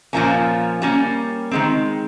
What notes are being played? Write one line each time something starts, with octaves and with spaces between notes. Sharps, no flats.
A#2 F3 A#3 C#4
G3 A#3 C#4
D#3 G#3 C4